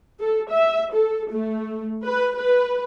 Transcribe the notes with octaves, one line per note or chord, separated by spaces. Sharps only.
A4
E5
A4
A3
B4
B4